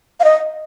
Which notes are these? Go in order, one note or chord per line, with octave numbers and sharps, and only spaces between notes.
F5
D#5